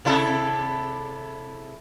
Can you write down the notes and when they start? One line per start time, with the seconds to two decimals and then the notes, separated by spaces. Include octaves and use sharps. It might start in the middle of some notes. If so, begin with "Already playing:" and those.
0.05 C3 E4 A4